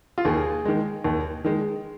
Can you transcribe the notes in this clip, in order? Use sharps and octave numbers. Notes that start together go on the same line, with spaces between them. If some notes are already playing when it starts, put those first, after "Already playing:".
F4
D#2 G#4
D#3 G#3
D#2
D#3 G#3